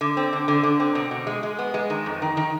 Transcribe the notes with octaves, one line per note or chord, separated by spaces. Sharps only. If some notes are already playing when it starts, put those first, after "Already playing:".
D3
C4
D3
D3
D3
C4
B2
B2
G#3
G#3
B3
G#3
D#3
F2
D#3
D#3